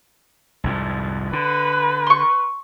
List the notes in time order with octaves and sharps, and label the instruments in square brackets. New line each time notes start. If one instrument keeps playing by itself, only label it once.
[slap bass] C2 F2 G#2
[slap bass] D3 [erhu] B4
[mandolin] C6 C#6